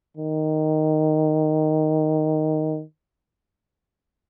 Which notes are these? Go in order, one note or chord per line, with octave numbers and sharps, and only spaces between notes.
D#3